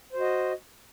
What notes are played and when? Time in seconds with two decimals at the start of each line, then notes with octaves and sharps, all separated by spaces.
0.13 C5
0.17 F#4
0.21 D#5